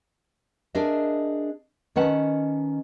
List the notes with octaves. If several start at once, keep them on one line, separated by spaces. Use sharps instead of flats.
D4 G#4 A#4 D#5 E5
D#3 C#4 B4 F#5 A5